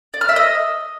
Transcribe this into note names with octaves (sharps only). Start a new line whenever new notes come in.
D5
F6
E5
D#5